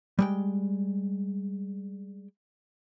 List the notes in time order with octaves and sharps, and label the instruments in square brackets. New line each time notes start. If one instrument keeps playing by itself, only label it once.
[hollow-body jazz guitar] G3 G#3 G5